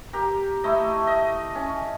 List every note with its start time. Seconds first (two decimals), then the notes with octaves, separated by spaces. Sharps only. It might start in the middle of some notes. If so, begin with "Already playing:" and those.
0.13 G4 A#4
0.64 A3 E4 D#5
1.07 D#5
1.55 C#4